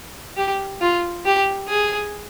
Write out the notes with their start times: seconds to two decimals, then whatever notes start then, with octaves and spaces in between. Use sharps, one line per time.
0.37 G4
0.81 F4
1.25 G4
1.68 G#4